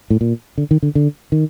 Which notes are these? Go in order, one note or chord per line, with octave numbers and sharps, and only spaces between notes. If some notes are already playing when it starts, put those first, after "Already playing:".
A2
A#2
D3
D#3
D3
D3
D#3